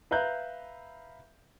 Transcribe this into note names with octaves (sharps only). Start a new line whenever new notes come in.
B4 E5 F5 A#5 F#6 G6